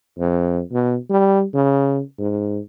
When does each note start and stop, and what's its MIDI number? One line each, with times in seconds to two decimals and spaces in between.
0.19 0.61 41
0.72 0.96 47
1.10 1.44 55
1.54 2.00 49
2.19 2.59 44